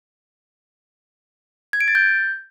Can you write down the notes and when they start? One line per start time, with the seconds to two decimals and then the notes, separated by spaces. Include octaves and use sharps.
1.73 G#6
1.81 D7
1.88 A6
1.95 G6